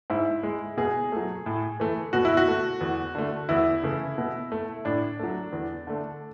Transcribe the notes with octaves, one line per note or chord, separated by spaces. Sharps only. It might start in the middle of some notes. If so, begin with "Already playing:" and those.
G#2 E4
G#3
B2 G#4
F#3 A3
A2
E3 A3
B2 F#4
E4
F#4
A3
E2
D3 A3
E2 E4
C#3 E3 A3
B2
A3
A2 D4
F#3 A3
E2
D3 A3